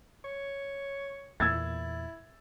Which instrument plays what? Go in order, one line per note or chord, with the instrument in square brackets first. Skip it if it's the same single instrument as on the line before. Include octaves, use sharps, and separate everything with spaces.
[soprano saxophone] C#5
[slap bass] E2 A#2 [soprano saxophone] E4 [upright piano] E6 G#6 A6